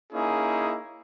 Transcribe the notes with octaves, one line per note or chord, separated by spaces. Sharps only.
A#3 C#4 D#4 E4 G#4